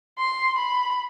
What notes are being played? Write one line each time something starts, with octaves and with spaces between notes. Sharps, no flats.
C6
B5